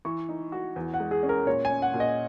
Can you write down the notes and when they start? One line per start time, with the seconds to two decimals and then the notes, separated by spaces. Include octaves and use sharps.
0.05 E3 C#6
0.29 D#4
0.52 F#4
0.76 E2
0.94 F#5
1.00 G#3
1.11 G#4
1.23 C#4
1.29 A#4
1.46 A#2 C#5
1.65 G#5
1.70 C#4
1.82 F#5
1.94 A#2
2.00 D#5